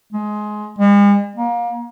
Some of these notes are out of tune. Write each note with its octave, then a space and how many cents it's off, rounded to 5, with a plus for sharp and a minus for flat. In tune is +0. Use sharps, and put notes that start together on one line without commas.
G#3 +20
G#3 -45
A#3 +30